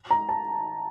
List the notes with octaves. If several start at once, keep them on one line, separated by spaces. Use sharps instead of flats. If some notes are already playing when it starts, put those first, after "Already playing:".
A#5
A5